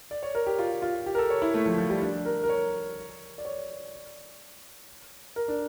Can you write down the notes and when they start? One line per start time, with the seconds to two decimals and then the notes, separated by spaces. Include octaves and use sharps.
0.11 D5
0.23 C#5
0.35 A#4
0.47 G4
0.59 F4
0.82 F4
1.06 G4
1.15 A#4
1.18 A4
1.30 C#5
1.42 E4
1.54 A3
1.66 F3
1.78 F3
1.90 G3
2.01 D4
2.25 A#4
2.43 A#4
2.49 C#5
3.38 D5
3.45 C#5
5.36 A#4
5.48 D4